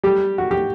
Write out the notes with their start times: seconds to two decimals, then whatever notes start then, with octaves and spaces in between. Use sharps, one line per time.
0.04 G3 G4
0.38 F#4
0.51 G4